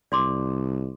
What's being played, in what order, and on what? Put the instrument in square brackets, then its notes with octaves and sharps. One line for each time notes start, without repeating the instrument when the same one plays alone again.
[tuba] C2 [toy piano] D5 C6 D6